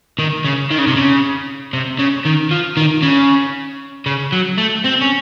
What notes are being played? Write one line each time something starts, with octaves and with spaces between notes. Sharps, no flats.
D#3
C#3
D#3
C#3
C3
C#3
C3
C#3
D#3
F3
D#3
C#3
C#3
F#3
A3
C4
C#4